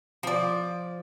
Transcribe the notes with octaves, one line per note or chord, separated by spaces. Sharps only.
F3 D5